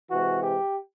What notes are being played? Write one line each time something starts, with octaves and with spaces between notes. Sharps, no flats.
C3 E3 G#3 F#4
G4